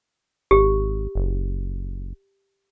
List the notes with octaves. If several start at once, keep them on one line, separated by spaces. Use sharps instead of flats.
G#1 G4
F#1